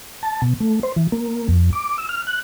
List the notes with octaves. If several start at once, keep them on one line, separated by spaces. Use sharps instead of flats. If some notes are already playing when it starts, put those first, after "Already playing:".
A5
B2
A3
C5
E3
A#3
F2
D6
E6
F6
F#6